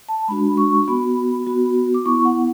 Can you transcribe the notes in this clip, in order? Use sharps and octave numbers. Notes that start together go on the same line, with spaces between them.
A5
G#3 D4 F#4 B5
C#6
B3 F#4 B5
B3 F#4
D6
B3 E4 C#6
F#5